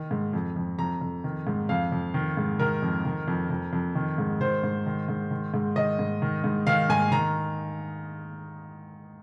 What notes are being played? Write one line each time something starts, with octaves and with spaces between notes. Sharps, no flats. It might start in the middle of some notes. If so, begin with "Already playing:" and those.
Already playing: D#3
G#2
F2
F2
F2 A#5
F2
D#3
G#2
F2 F5
F2
D#3
G#2
D#3 A#4
F2
D#3
F2
F2
F2
D#3
G#2
D#3 C5
G#2
D#3
G#2
D#3
G#2
D#3 D#5
G#2
D#3
G#2
D#3 F5
G#2 G#5
D#3 A#5